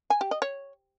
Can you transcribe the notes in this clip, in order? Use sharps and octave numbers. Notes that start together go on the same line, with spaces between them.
G#5
G4
D#5
C#5